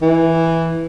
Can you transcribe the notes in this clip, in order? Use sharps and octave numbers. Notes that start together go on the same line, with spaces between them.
E3